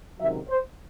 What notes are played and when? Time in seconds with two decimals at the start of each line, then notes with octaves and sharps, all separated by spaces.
0.19 C#2 C3 D#3 F#3 E5
0.48 C5